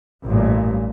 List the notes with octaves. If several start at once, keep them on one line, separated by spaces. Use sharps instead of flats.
A1 G2 A#2